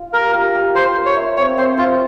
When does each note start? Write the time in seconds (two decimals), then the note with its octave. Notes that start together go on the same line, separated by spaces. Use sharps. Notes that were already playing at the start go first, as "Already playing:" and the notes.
Already playing: F4
0.13 G4 A#4
0.33 G4
0.55 G4
0.75 G4 C5
0.96 A#4
1.06 C#5
1.16 E5
1.37 C4 C#5
1.57 C4 C5
1.77 F4 C5